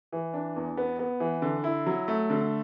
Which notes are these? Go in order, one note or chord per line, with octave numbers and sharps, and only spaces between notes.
E3
D4
E2
B3
B3
E3
D3
E4
F#3
A3
D3